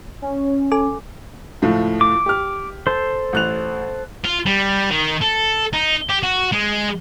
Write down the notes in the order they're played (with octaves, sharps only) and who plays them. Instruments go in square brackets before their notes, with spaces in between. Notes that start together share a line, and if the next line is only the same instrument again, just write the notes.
[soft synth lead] C#4
[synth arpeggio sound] A4 G#5 D6
[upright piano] C#2 A2 F3
[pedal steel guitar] D6
[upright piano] G4 F6
[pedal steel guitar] A4 C5
[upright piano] A1 F#6 F7
[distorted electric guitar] F4
G3
D#3
A4
D#4
G4
F#4
G#3